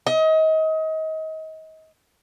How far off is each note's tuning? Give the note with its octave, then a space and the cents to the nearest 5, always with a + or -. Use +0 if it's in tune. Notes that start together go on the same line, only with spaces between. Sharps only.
D#5 +30